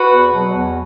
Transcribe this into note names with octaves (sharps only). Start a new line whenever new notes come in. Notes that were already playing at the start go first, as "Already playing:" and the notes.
Already playing: F#4 B4
E2
B2 F#3
E2